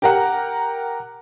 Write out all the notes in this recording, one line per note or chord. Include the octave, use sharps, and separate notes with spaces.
G4 A#4 F#5